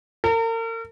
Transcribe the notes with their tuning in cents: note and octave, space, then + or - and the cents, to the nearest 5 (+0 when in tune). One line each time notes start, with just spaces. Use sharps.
A#4 -40